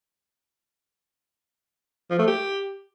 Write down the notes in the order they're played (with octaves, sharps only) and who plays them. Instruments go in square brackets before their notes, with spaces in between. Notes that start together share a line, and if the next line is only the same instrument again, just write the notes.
[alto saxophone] F3
A3
G4